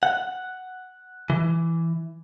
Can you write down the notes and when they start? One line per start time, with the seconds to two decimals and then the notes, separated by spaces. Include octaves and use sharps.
0.03 F#5
1.30 E3